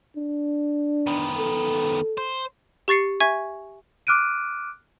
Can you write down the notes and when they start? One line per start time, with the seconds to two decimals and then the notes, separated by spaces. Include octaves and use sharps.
0.16 D4
1.07 D#3 B3
1.38 A4
2.18 C5
2.88 G4 C#6 A6 C7 C#7
3.20 E5 G#5 C#6 G#6
4.07 D6 F6 F#6 D7 D#7